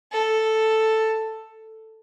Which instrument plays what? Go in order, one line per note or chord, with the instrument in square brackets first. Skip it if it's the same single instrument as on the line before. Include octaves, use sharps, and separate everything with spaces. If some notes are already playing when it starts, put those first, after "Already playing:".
[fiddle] A4